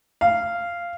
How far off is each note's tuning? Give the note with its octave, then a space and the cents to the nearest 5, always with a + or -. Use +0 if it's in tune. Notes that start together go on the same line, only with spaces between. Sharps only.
F5 -10